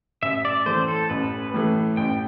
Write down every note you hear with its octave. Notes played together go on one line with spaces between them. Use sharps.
A1 E5
D5
A2 E3 A3 C5
A4
A1 B4
A2 E3 A3
A1 G5